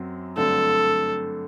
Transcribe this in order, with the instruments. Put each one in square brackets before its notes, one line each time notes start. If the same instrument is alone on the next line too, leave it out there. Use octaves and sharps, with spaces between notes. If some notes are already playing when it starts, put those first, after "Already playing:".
Already playing: [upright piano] F#2 F#3 C4
[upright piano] G2 D3 F#3 A3 C4 [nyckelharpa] A4